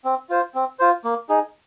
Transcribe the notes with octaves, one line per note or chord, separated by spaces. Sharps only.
C4
F4 C5
C4
F4 C5
A#3
D#4 G#4